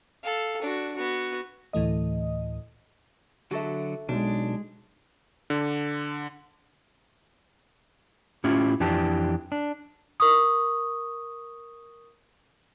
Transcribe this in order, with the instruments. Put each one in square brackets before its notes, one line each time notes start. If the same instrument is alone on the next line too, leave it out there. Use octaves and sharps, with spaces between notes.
[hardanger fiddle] A4 F5
D4 F#4
B3 F#4
[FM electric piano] D2 A2 E3 A3 D#5
[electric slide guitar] D3 F#3 [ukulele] F#4 A4 E5
[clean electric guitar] B1 [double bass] G#3 [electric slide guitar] D4
[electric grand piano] D3
[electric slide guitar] A2 C#4 E4 F4 G4
F2 E3 D4 G4 A5
D4
[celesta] A#4 C#6 D#6